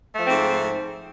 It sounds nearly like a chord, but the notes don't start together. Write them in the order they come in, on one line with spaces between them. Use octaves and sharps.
A3 F3 C4 G#2